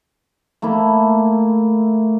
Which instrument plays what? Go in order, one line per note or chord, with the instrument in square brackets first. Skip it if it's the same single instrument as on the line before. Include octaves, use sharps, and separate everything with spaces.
[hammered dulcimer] A3 A#3 E4